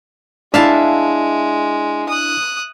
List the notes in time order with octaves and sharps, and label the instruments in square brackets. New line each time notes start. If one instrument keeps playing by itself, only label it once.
[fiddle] G#3 [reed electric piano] D4 E4 [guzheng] E5 F5 A5
[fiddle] D#6 F#6